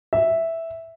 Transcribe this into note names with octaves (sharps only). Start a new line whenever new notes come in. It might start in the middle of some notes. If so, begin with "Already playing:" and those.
E5